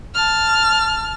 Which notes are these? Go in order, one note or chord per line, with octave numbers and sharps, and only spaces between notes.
A5 F6